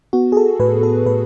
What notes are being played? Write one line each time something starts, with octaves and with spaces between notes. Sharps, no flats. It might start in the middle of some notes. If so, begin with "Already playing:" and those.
B3 F#4
G#4
A4
A2 B4
A4
A2 B4